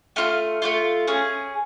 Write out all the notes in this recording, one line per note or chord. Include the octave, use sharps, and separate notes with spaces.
A3 F4 F6
A3 D4 F4
C#4 G#4